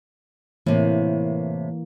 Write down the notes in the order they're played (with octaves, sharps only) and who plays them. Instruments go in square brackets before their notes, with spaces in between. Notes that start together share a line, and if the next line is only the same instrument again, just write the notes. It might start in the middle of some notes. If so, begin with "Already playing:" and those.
[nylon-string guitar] A2 C3 [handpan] E3 A#3